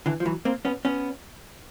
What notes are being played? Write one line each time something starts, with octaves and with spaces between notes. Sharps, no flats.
D3 E3
F3
E3 F#3
A#3 C4
B3 C#4
B3 C#4